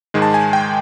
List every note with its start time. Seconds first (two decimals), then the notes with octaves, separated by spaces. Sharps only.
0.14 G#2 D#3 G#3
0.22 A5
0.34 G#5
0.53 G5